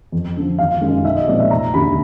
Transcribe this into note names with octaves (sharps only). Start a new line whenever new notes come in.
F2
D3 F3
G#1 F5
F#2 D#3 G#3
B1 E5
D#5
A#2 F3 G#3 C4 D5
E5
F1 A#5
D#2 D3 B5